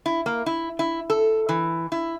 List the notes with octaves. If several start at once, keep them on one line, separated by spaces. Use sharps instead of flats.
E4
A#3
E4
E4
A4
E3
E4